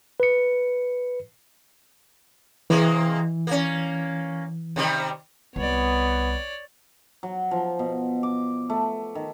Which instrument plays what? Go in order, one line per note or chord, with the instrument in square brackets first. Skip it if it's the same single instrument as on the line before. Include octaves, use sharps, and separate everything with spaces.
[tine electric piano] B4 C#7
[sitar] C3 G#3 A#3 [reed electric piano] E3
[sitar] A#3 C#4
C3 D#3 G3
[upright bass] C2 [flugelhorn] B3 [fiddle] C#5 D5
[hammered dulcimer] F#3
F3
B2
D6
A3
D#3